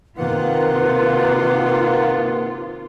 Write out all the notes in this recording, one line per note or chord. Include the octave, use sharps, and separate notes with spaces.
C3 D#3 A#3 F4 B4 F#5